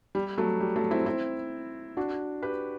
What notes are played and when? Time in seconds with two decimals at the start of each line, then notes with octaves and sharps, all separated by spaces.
0.15 G3
0.38 F#3 A3
0.60 G3
0.76 F#3 A3
0.91 C4 E4
1.06 C4 E4
1.97 D4 F#4
2.42 G4 B4